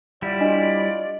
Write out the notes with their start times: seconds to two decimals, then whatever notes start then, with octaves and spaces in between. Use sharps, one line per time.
0.22 G3 E4 F4 C#5 D5 F#5
0.40 D4 F#4 D#5